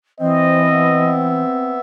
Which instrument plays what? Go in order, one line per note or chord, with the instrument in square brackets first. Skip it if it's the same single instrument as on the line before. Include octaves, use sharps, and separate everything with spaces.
[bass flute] E3 [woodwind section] C4 [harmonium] C5 [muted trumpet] D#5
[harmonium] B3 E5